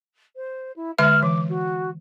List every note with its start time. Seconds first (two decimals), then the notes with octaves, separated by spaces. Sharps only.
0.36 C5
0.76 E4
0.99 D3 G#3 E5 F6
1.23 E3 D6
1.49 F#4